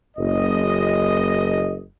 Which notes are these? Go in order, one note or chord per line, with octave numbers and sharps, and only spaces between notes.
F#1 D#5